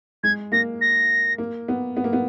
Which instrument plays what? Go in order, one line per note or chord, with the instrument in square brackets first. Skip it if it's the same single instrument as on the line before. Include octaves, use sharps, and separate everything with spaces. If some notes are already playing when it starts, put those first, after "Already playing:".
[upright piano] G#3 [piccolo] G#6
[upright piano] A#3 [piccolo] A#6
[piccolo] A#6
[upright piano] A#3
B3
B3
A#3
B3